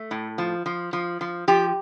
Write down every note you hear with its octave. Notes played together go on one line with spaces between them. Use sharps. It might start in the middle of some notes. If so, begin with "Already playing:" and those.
Already playing: A3
A2
F3
F3
F3
F3
F3 G4